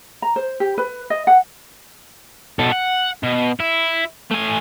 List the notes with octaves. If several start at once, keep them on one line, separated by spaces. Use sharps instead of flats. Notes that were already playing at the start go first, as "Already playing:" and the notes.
A#5
C5
G4
B4
D#5
F#5
B2 A4
F#5
B2
E4
A3 G#5